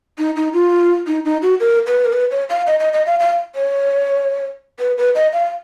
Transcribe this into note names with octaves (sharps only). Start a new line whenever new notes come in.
D#4
D#4
F4
D#4
D#4
F#4
A#4
B4
A#4
B4
C#5
F5
D#5
D#5
D#5
F5
F5
C#5
B4
B4
D#5
F5